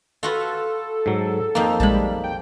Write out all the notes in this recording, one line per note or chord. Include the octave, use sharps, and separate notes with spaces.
F4 F#4 A4 B4
G#2 F#3
F2 F3 A#3 D#4
A#1 G3 G#3 A5 B5
G5